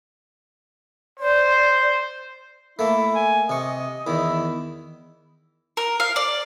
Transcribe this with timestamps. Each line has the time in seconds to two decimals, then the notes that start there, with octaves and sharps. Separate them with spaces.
1.19 C5 D5
2.79 A3 A#3 E4
3.15 G#5
3.50 C3 D#5 C#6
4.07 E2 D#3 E4
5.77 A#4
6.00 F5
6.16 D5